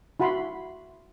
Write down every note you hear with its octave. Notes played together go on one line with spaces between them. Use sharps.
E4 F#4 F#5 B5 C6